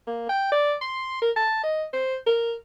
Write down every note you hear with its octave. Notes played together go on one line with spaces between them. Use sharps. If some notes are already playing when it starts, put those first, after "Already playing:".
A#3
G5
D5
C6
A#4
A5
D#5
C5
A#4